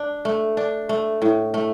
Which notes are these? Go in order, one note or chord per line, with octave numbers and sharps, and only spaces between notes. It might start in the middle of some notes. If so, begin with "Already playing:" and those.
Already playing: D4
A3
D4
A3
A2
A3